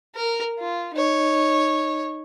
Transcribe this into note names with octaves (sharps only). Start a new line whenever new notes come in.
A#4
F4
D#4 C#5